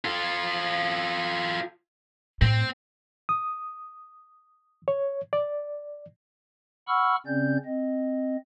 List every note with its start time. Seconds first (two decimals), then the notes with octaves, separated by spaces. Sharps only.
0.05 F4 A4
2.42 A2 C4
3.29 D#6
4.88 C#5
5.33 D5
6.88 F#5 B5 C#6 E6 F6
7.26 C#3 C4 C#4 D5 G6
7.65 C4 D#5